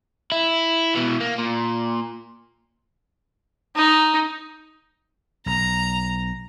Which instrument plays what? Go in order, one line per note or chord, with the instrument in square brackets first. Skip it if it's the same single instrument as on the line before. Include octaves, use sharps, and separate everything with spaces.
[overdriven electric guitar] E4
B2 E3
A#3
A#2
[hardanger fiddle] D#4
[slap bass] B1 [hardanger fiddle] A#5